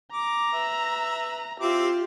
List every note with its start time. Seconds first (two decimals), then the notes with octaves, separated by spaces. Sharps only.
0.12 A#5 D6
0.53 B4 E5
1.60 C4 E4 F4 G4 D6